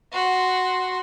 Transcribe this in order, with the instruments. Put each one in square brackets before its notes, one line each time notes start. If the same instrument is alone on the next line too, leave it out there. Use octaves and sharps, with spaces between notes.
[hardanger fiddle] F#4 C6